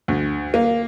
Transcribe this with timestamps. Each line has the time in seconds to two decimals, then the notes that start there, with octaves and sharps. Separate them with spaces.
0.08 D2
0.54 A#3